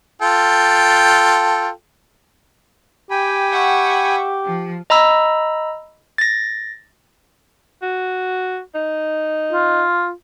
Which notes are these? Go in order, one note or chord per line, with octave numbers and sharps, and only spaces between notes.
F4 A4 G5
G4 G5 G#5 B5
E5 F#5 C#6
F3
D#5 A#5 B5 E6
A6 A#6
F#4
D#4
F4